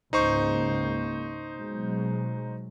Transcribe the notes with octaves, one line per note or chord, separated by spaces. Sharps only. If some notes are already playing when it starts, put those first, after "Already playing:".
C#2 G#2 A#3 D#4 C5 C#6
B2 F#3 G#3